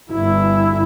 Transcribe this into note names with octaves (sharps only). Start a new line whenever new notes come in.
G1 E4